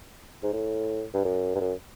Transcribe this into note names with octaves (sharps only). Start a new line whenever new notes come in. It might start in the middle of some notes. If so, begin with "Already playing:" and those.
G#2
A2
G2
F#2
G2
F#2